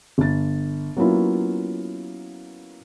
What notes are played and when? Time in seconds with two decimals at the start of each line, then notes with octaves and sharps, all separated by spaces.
0.18 G1 A6
0.97 F#3 A#3 B3 C#4 E4 F4